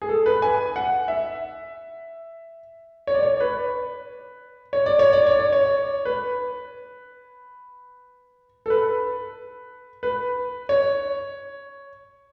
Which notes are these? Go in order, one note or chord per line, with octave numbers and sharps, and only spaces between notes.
G#4
A4
B4
G#5
F#5
E5
C#5
D5
C#5
B4
C#5
D5
C#5
D5
C#5
D5
C#5
B4
A4
B4
B4
C#5